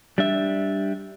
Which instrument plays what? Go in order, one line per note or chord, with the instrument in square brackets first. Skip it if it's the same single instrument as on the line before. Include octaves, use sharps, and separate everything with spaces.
[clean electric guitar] G3 D4 E5